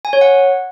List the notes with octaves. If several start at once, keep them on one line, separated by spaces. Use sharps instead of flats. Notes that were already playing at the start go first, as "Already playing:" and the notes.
G#5
C#5
F#5